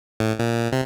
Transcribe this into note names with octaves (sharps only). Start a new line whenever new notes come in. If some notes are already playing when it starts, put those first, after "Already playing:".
A2
A#2
C3